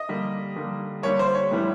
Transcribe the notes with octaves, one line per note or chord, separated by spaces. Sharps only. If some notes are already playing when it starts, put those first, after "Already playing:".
Already playing: D#5
D3 G3 A#3
D3 G3 A#3
D3 G3 A#3 C#5
C5
C#5
A2 E3 G3 B3